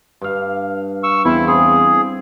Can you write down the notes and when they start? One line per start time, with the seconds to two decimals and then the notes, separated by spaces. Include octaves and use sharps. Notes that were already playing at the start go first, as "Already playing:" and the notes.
0.21 G2 F5
1.03 C#6 E6
1.25 E2 C4 E4 F5
1.47 C4 G#4